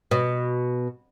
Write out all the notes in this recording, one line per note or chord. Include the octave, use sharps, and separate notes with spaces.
B2